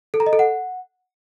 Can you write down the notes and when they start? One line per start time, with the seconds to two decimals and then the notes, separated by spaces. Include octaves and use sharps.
0.14 A4
0.20 A#5
0.26 D#5
0.33 A4
0.39 F#5